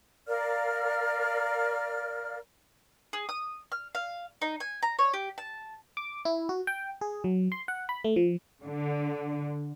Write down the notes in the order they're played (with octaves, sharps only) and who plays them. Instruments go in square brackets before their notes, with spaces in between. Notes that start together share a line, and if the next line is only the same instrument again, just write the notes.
[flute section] A#4 D5 F5 F6
[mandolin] G#4
D#6
F6
F5
D#4
G#5
A#5
C#5
G4
A5
[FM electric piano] D6
E4
F#4
G5
G#4
F#3
C6
F#5
B5
A3
F3
[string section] D3